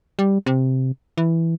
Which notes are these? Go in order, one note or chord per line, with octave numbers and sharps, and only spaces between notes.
G3
C3
E3